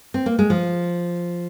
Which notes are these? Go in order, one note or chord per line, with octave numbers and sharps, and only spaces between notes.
C4
A#3
G#3
F3